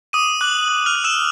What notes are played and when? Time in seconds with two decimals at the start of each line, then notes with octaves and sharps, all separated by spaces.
0.13 D6 D#6 D#7
0.41 D6 F#6 F#7
0.68 F#6
0.86 F6 F7
0.95 F#6
1.04 E6 E7